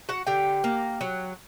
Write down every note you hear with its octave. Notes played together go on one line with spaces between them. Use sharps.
F#4 F#5
D3 G4 G5
A#3
F#3